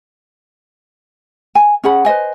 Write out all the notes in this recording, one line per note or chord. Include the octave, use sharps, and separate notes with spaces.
G#5
C#4 G#4 F#5 B5
B4 C5 D#5 G#5